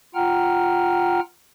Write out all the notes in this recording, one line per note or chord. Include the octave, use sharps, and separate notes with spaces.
F4 F#5 G5 A#5 F6